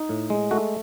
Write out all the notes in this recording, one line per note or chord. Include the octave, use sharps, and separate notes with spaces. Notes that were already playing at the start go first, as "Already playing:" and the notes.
Already playing: D#4
A2
G#3
A3 F#4